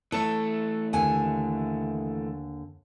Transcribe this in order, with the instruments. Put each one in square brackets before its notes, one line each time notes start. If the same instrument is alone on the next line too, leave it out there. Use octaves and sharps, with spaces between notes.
[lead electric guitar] E3 A3 [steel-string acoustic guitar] A4 C#5
[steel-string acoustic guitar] D#2 D3 G#5